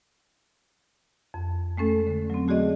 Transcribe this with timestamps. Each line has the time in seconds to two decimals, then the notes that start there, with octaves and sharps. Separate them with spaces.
1.34 F2
1.77 G#3 A3 C#4 A4
2.07 D3
2.30 F#3 C4
2.48 A3 F#4 G#4 D5 D#5